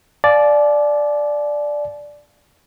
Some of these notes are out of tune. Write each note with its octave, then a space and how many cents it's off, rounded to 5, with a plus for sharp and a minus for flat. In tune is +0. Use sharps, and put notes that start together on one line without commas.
D5 +0 F5 +0 A5 -45